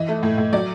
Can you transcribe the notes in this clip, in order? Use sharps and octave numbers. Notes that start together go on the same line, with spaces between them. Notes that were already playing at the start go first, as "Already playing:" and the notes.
Already playing: E3 D#5
A3
A2
A2
F#3 D5